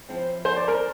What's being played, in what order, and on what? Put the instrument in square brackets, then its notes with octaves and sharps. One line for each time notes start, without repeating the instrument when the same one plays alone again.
[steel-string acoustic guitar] F3 C4 E4
[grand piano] C5
D5
A#4